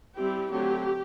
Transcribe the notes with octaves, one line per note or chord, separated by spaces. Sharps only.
G3 C4 E4 G4
D3 F#3 A3 C4 G4